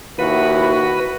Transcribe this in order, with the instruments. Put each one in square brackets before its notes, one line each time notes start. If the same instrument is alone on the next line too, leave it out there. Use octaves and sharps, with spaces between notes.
[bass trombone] D#2 [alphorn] E4 [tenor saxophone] F#4 [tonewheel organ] B4